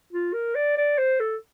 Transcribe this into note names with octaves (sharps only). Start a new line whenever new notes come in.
F4
A#4
D5
D5
C5
A4